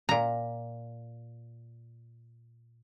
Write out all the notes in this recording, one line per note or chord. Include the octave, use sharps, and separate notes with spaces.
A#2 A#5